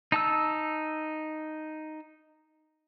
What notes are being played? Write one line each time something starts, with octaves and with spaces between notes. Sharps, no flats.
D#4 A5 E6